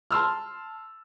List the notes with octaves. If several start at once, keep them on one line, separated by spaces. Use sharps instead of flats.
A5 C6 E6 F6